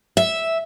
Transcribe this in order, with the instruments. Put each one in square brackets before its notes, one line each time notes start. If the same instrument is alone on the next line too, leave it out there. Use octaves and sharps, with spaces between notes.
[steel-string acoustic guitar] E5